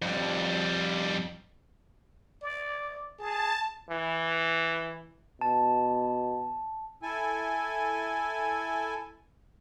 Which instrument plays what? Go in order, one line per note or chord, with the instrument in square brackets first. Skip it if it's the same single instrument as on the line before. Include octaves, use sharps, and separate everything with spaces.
[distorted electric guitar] F2 G3
[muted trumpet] D5
[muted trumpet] G#4 [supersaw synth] A5
[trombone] E3
[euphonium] B2 [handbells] A5
[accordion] E4 A4 G#5